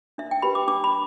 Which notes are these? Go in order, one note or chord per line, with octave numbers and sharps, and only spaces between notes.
D4 E5
G5
G4 B4 B5
D6
D4 D6
B5